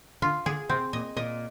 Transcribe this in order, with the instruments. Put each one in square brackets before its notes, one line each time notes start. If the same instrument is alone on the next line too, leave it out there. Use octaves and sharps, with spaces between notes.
[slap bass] D3 [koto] F4
[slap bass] D3 [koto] G#4
[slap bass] C3 [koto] C4
[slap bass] A#2 [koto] D#5
[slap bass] A#2 [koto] D#5